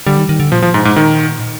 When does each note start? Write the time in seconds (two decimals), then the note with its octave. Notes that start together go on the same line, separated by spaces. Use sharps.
0.06 D3 G3
0.17 D#3
0.29 D#3
0.40 D3
0.52 A#2 F3
0.62 F3
0.74 G#2
0.85 G#2
0.96 D#3